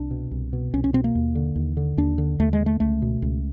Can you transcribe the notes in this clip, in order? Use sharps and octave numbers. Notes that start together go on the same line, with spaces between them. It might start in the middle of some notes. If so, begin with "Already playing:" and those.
Already playing: C2 D4
B2
C2
B2
C2 C#4
C#4
B2 C4
A#3
D#2
D3
D#2
D3
D#2 D4
D3
D#2 A3
G#3
D3
A3
C#2 A3
B2
C#2